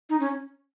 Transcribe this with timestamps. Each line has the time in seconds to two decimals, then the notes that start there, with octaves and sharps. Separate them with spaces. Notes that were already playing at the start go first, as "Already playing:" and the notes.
0.10 D#4
0.20 C#4